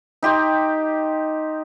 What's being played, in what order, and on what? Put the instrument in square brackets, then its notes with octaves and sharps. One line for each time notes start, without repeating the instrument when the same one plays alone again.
[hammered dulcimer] D#4 G4 C6